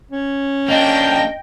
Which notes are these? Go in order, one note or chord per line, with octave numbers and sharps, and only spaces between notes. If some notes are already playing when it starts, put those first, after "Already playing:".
C#4
A#3 D4 D#5 G5